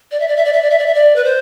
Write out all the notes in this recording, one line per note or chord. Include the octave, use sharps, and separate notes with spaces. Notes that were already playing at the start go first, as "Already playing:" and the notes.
D5
E5
D5
E5
D5
E5
D5
E5
D5
E5
D5
B4
C5